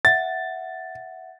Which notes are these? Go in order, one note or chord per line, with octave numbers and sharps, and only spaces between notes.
E5 F#5 A6